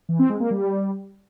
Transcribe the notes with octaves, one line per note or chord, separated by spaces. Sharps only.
E3
C4
G#3
A#3
G3